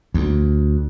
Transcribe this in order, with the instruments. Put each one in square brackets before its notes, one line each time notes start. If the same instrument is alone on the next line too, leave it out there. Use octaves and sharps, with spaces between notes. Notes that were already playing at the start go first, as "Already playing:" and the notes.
[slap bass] D2